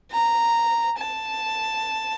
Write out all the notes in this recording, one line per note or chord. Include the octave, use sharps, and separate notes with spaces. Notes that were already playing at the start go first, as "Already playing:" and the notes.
A#5
A5